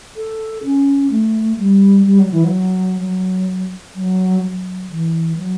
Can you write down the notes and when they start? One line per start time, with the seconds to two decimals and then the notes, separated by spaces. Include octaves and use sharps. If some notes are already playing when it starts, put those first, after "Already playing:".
0.16 A4
0.64 C#4
1.10 A3
1.58 G3
2.06 G3
2.19 F#3
2.31 E3
2.44 F#3
3.00 F#3
3.95 F#3
4.42 F#3
4.90 E3
5.36 F#3